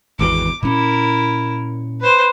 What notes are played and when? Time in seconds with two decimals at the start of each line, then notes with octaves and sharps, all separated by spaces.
0.19 G#1 E2 B2 D6
0.63 A#2 C#4 E4 A#4
2.00 B4 C5